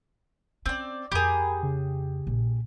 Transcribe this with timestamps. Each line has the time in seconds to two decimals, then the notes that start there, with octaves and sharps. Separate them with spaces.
0.66 C4 C#4 D5
1.12 F2 G4 G#4 A#4 A#5 B5
1.63 C#3
2.27 A#1